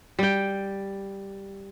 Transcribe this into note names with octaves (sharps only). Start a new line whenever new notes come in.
G3 G5